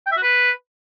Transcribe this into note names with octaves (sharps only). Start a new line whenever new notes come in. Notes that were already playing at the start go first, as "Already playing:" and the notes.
G5
E5
F#4
B4